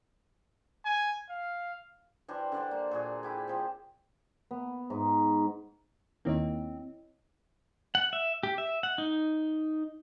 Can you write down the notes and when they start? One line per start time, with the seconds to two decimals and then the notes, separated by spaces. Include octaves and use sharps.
0.85 G#5
1.29 F5
2.28 E3 D4 G4 C5
2.52 D3 D4 D5 C6
2.71 A#3
2.91 A#2 F#4 G#4
3.23 E4 G4 G#4
3.48 F3 C4
4.51 B3
4.90 G#2
6.25 D#2 D#3 A#3 C4 E4 C#5 D#5
7.95 F#5
8.13 E5
8.43 G4
8.58 E5
8.83 F#5
8.98 D#4